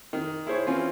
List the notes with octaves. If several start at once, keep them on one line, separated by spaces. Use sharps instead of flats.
D#3
E4 G#4 C5 C#5
E3 C4 C#4 F4